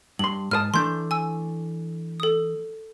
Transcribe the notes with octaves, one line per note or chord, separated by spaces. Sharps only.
G2 C6 F#7
G#2 B4 A5 D#6 F6
E3 A3 D4 C6 G6
G#5 E6
A4 D#6